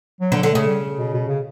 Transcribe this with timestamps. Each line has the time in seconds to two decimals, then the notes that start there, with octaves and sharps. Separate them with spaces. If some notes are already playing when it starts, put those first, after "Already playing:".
0.21 F#3
0.32 D3
0.36 F#3
0.43 D3
0.51 C#3 A3
0.66 G3
0.98 B2
1.13 B2
1.28 C#3